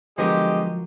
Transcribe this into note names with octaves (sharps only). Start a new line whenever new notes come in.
D3 F3 F#3 G#3 B3 G4 A#4 D#5